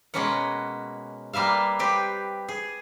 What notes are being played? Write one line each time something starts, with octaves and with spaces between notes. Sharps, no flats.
B2 G#3 A#3 C#4 B4 F#5
G3 A#3 B4 E5 F5
C4 G4 B4
G#4